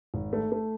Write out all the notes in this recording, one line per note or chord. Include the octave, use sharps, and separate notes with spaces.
G#1
A3
A3